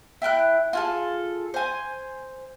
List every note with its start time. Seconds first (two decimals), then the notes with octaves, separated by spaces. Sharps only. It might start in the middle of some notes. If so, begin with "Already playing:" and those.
0.22 E4 G5 F6 F#6
0.73 F4 G#4 A4
1.54 C5 G#5